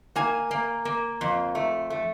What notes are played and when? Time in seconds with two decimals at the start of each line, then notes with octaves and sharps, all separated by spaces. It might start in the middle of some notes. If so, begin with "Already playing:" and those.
0.16 A#3 G#5
0.51 A#3
0.85 A#3
1.21 F2
1.55 A3
1.90 A3